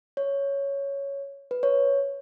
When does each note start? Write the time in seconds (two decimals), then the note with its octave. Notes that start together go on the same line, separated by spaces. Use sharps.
0.17 C#5
1.51 B4
1.63 C#5